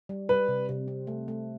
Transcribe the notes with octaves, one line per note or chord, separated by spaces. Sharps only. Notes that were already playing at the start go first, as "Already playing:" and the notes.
G3
G3 B4
C3
C3
C4
A3
A3